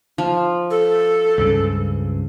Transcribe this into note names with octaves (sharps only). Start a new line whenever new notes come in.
F3
A4
C#2 G2 C#3